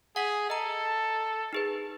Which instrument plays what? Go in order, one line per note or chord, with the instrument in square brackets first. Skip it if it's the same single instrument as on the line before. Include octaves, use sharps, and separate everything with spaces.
[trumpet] G#4 [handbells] F#5 B6
[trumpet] A4 [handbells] D#5 A#5
[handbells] D#4 G#4 B4